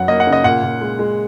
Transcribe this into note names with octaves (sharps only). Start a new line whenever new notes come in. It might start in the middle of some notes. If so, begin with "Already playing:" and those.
Already playing: F#2 F#3 F#5
A#3 D#5
F#5
C#3
D#5
A#2 F#5
A#2
G#3
G#3